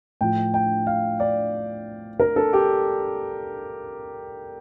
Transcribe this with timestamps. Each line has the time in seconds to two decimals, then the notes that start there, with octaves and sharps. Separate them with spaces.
0.21 A2 F3 G5
0.54 G5
0.87 F5
1.20 D5
2.20 A#4
2.36 A4
2.53 G4